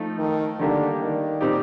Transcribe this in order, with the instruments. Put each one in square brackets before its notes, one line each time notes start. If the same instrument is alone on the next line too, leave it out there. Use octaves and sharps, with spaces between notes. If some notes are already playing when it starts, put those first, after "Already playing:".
Already playing: [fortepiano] F3 A3 D#4
[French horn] D#3
[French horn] D3 [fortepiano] D#3 G3 A#3 D4
[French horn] D#3
[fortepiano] A#2 G3 C4 D#4 G4